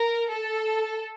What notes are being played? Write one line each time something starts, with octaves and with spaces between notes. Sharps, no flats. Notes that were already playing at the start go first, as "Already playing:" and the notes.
Already playing: A#4
A4